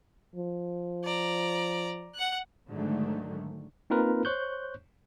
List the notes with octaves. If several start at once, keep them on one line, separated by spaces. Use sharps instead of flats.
F3
D5 A#5
F#5 F#6
G#2 D3 D#3 F#3 G#3 A3
A#3 C4 D#4 F4 A#4 B4
C5 C#5 C#6 F#6 G6